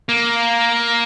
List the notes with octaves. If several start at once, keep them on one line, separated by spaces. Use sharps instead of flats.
A#3